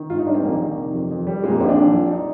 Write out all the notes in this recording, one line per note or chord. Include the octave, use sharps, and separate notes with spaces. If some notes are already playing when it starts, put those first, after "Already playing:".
Already playing: D#3
G#2 F4
D#4
G3 D4
C4
A#1 A#3
D#3
C3
F2
F2
G3
A#2 G#3
A#3
A#1 C4
D4
A#1
F3
D#4